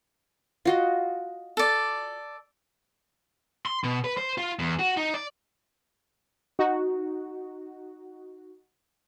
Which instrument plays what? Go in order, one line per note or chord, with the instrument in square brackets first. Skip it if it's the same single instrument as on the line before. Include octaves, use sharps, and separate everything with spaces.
[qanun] F4 F#4 D#5
[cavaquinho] A4 D5
[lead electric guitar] C6
B2
B4
C5
F4
E2
F#4
D#4
D5
[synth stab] D#4 F#4